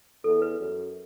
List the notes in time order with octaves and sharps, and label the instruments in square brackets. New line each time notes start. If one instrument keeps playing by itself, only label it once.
[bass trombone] E2 [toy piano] A4
[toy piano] B4
[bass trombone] F#2